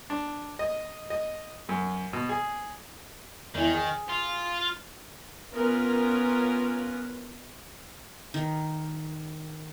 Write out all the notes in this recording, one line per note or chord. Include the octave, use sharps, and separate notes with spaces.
D4
D#5
D#5
F#2
B2
G#4
E2 D#3 E3
G#4
F4
B3 C#4 F4 A#4 B4
D#3